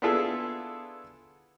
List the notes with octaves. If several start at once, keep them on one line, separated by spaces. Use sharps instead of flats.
B3 D4 E4 F4 G#4 A4